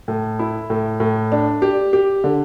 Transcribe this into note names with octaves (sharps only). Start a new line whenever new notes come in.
A2
E4
A2
A2
D4
G4
G4
D3